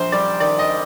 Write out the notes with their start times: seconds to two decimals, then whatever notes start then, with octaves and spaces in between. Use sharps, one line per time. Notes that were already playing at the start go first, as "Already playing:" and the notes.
Already playing: A#1 C5
0.12 G3 D5
0.40 D#3 D5
0.59 D#5